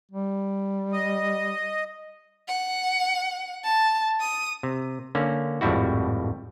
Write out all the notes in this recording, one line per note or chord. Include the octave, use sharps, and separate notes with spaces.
G3
D#5
F#5
A5
D#6
C3
D3 A#3 C#4
G#1 F2 A2 G3 E4 F#4